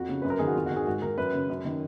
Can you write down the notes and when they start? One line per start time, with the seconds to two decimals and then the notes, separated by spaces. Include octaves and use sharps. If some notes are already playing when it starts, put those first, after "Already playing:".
Already playing: F2 F#4
0.09 C#3
0.22 F#2 B4
0.30 A#4
0.39 D#3 G#4
0.47 F#4
0.55 F2 F4
0.66 F#4
0.71 D#3
0.76 G#4
0.87 G#2 F#4
1.02 D#3 A#4
1.18 F#2 B4
1.33 C#3
1.49 F#2
1.65 D#3